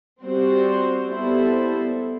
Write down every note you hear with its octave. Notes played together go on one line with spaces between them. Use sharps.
G3 C4 F#4 C5
G3 B3 E4 A4 C5